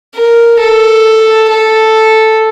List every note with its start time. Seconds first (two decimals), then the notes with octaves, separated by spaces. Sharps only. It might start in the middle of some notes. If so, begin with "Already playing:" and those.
0.16 A#4
0.60 A4
1.49 A4